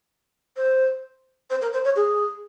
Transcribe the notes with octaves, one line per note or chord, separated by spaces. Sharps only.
C5
C5
A#4
C5
C#5
G#4